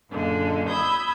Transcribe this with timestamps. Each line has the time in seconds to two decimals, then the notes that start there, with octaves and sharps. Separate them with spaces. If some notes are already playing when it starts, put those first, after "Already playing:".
0.10 F#2 A#2 D3 G#3
0.68 B5 D#6 E6 G6 G#6